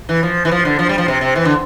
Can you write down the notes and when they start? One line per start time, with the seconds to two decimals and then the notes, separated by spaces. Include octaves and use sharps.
0.09 E3
0.23 F3
0.45 E3
0.51 F3
0.65 D3
0.79 F3
0.89 G3
0.98 F3
1.08 C3
1.21 C3
1.36 E3
1.45 D3